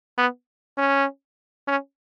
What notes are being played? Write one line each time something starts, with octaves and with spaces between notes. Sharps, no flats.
B3
C#4
C#4